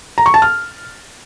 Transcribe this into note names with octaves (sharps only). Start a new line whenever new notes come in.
A#5
C#6
A5
F6